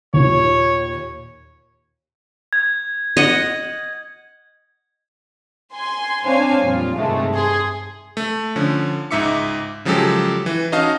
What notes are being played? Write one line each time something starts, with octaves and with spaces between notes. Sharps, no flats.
D#2 A#2 C#5
G#6
D#5 F#5
G#5 C6
C4 D4 C5 C#5 F5 G#5
F2 A#2 G3 F4
G2 C3 D#3 G#3 A3
G2 G#4 C6
A3
D3 F3 C#4
C#2 G#2 D#4 E5 D6 C#7
C#3 F3 F#3 G#3 G4 A4
E3
C#4 D#4 F#4 D#5 F5 A5